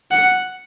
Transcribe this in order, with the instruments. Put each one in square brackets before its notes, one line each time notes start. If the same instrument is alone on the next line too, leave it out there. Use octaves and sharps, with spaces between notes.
[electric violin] F#5